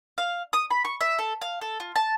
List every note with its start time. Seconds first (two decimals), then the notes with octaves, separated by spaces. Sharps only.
0.18 F5
0.53 D#6
0.71 B5
0.85 C#6
1.01 E5
1.19 A4
1.41 F5
1.61 A4
1.80 F4
1.96 A5